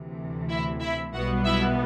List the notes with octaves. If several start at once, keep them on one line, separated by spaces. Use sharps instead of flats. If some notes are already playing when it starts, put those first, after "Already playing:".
Already playing: D2 C3 E3
E4 E5
E4 E5
B1 B2 G3 B3 F#4 F#5
E4 E5